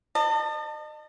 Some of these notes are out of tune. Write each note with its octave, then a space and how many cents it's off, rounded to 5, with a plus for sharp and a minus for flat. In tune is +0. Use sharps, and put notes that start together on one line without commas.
D#5 -40 A5 +30